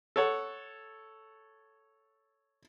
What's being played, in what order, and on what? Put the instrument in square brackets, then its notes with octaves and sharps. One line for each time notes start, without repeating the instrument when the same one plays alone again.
[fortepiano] A4 C#5 F#5